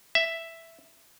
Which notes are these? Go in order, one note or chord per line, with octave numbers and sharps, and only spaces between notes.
E5